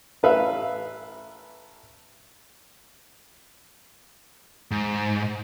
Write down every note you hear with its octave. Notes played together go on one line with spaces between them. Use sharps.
A1 B4 E5 F5
G#2